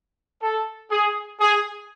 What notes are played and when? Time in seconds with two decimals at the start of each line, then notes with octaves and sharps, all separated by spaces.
0.42 A4
0.91 G#4
1.40 G#4